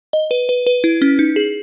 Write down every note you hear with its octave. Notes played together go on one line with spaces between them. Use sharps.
D#5
B4
B4
B4
E4
C#4
D#4
G#4